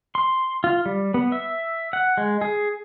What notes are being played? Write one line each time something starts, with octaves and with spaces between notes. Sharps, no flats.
C6
F4
G3
B3
E5
F#5
G#3
G#4